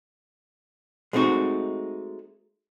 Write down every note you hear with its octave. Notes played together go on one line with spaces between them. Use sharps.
G#3 A3 C4 D#4 F#4